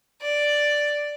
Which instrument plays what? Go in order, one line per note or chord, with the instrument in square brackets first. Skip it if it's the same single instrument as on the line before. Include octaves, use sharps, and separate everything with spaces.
[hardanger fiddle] D5